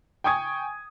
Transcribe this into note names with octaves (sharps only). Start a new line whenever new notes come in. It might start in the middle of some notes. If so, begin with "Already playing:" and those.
G5 G#5 C#6 D#6 G#6